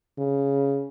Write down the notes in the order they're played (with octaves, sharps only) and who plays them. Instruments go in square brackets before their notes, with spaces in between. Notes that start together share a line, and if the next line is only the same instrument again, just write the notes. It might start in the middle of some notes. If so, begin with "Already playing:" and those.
[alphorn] C#3